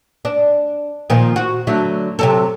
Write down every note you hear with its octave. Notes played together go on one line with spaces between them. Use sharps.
D4
A#2 D#3 F3
F#4
D3 F#3 A3
C3 F#3 A4